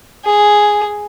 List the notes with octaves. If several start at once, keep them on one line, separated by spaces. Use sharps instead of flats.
G#4